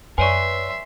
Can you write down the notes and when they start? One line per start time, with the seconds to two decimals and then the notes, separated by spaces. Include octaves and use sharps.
0.18 F#2 B4 C#5 D5 E5 G#5 C6 C#6